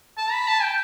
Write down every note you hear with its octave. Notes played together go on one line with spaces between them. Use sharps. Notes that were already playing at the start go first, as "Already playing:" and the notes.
A5
B5
A5
G5